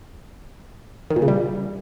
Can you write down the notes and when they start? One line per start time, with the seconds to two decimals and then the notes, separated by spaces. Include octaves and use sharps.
1.10 D#3
1.16 A#2
1.22 C#3
1.28 G3